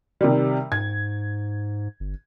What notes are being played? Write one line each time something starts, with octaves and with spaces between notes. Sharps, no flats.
C3 D#3 G3
G#2 G#6
G1